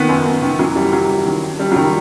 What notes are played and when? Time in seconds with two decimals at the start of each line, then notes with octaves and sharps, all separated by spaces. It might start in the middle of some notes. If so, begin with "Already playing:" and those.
Already playing: D#3 B3
0.09 F#2
0.26 F#2
0.42 D#3
0.59 E3 F#3
0.76 F#2 G3
0.92 F#2 F#3
1.09 E3
1.26 D#3
1.42 G2
1.59 G2 G3
1.72 F#3
1.76 D#3 G3